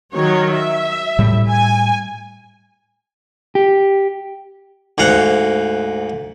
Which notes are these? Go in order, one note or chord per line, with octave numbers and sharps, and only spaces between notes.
D#3 F#3 C#5
E5
A2 G3
G#5
G4
D2 G#2 F5 F#5